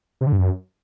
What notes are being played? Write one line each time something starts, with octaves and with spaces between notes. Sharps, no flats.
C3
D3
G2
F#2